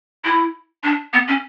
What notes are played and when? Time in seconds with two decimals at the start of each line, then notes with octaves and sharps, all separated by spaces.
0.24 E4
0.83 D4
1.13 B3
1.28 C#4